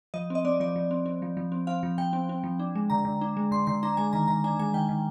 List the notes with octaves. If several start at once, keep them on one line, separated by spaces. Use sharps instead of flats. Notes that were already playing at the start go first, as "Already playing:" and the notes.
F3 D#5
C4 D#5
C4 D5
F3 D5
F3
C4
C4
F3
F3
C4
C4 F5
F3
F3 G5
C4
C4
F3
D4
G#3
D3 A#5
D3
D4
G#3
D3 C6
D3 C6
D4 A#5
G#3 G#5
D#3 A#5
D#3 A#5
D4 G#5
G#3 G#5
D#3 G5
D#3